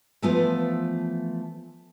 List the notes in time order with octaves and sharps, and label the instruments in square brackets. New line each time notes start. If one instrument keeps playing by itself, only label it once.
[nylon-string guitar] E3 F3 A3 B3 F4